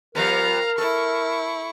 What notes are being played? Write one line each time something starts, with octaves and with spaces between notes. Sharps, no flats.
F3 G3 B3 A#4 F5 A#5
E4 A4 C#6